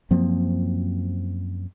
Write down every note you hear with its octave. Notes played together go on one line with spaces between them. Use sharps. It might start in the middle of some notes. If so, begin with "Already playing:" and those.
F#2 F3 A#3 C4